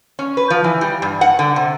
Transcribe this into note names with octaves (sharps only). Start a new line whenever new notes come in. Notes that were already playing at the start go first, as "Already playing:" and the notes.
C#4
B4
F3
E3
G3
G2
F#5
D3
C3